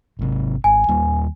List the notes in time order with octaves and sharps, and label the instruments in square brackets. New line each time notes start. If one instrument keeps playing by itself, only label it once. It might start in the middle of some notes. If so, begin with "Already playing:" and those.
[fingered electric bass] G#1 C3
[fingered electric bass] G#1 [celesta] G#5
[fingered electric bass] D#2 G3 A#3